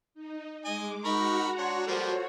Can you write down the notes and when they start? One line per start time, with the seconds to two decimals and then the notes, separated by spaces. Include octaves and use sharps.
0.14 D#4
0.64 G#3 D#5 G#5 D6
1.04 D#4 F#4 A#4 D#5 F#5 A#5 B5 C#6
1.58 D4 C#5 C6
1.87 F3 G3 A#3 F4 F#4 A4 C5 C#5